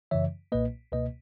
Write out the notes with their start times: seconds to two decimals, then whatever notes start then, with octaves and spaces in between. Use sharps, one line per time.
0.11 F#2 C#3 E3 C#5 E5
0.52 B1 A#2 A#3 B4 D#5
0.92 C#2 B2 A#3 B4 D#5